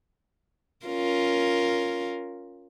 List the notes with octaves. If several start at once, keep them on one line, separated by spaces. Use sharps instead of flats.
C#4 F4 A#4